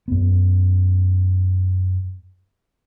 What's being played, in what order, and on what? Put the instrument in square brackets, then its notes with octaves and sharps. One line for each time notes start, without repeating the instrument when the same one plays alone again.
[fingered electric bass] F#2 B3